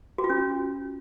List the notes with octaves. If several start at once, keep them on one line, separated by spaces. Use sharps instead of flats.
F#4
F4
C#4